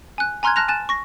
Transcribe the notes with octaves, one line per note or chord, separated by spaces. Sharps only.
G#5 F#6
G#5 A#5 C6 F6 F#6 G#6
A5 F6 F#6 A#6 F7
G#5 F#6 A6 E7
C#6 A#6